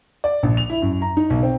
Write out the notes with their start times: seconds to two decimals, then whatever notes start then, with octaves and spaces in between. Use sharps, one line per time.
0.24 D5
0.43 A#1
0.57 F7
0.70 E4
0.82 F#2
1.02 A#5
1.17 D#4
1.30 B1
1.43 C4